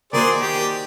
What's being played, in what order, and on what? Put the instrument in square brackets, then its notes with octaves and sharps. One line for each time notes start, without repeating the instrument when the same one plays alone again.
[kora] D#3 A#3 F#4 [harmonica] G#4 C5 D5
[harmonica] G4